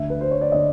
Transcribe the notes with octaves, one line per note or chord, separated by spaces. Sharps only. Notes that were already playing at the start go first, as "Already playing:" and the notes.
Already playing: D2 D3 E5
B4
C5
C#5
D5
D3 D#5